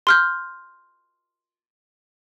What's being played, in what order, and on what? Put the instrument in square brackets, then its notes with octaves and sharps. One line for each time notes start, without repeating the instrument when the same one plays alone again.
[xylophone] C6 F6 G6